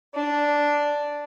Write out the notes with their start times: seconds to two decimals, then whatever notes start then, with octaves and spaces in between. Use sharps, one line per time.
0.14 D4